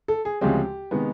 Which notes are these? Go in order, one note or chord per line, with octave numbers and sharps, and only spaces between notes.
A4
G#4
D2 C#3 F3 G#3 C4 G4
C3 D#3 G#3 B3